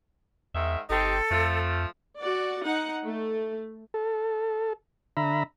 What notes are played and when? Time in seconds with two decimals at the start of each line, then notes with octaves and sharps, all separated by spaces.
0.54 E2 G#2 D#3 E5
0.90 G1 C4 D#4 G4 A4
1.31 F2 F3 A3
2.20 F#4 D5
2.64 D#4 F#5
3.04 A3
3.94 A4
5.17 D3 E5 A#5 B5